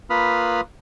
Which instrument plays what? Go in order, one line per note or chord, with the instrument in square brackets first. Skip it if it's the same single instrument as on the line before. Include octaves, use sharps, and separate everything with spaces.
[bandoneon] A#3 F4 B4 B5 D#6 F6